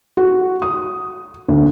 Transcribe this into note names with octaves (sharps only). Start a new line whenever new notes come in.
F#4
D#6
D2